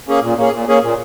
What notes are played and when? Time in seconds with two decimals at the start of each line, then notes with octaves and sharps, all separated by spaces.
0.08 A#3 C#4 G#4
0.22 A#2
0.37 A#3 C#4 G#4
0.53 A#2
0.68 A#3 C#4 G#4
0.82 A#2